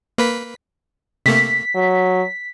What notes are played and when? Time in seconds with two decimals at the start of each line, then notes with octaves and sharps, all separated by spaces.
0.18 A#3 B4 B6
1.26 C3 A3 A#3 B6
1.75 F#3